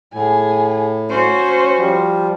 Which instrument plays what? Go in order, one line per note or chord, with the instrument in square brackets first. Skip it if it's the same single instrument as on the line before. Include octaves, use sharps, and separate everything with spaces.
[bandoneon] A2 [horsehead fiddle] G#4 G#5
[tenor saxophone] C#4 [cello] F#4 [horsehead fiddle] C5
[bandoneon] F3 G3